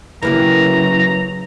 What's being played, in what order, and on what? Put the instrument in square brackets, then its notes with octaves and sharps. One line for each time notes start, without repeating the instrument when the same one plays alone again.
[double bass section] C#3 F#3 [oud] E3 A#3 G4 [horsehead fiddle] E4 [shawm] A#5